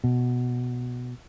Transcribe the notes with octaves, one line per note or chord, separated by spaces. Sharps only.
B2